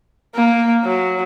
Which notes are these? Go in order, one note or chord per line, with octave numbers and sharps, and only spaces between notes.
A#3
F#3